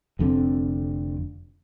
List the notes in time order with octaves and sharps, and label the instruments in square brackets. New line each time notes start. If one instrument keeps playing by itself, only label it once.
[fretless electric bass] F1 F2 D3 C4